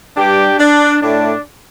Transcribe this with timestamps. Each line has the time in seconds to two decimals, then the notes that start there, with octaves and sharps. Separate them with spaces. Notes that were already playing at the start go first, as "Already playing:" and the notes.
0.17 G2 G3 D4 G4
0.60 D4
1.02 A2 A3 D4